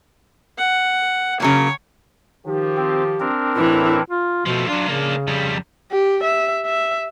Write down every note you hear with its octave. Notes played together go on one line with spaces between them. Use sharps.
F#5
C#3 F#3 A#3 C#5
D#3 F3 G4
C4
C4 D4 A#4
A2 E3 E4
F4
B2 F3 A3
F#3 D4 F4
C#3 A#3 D4
F2 G3
G4
E5
E5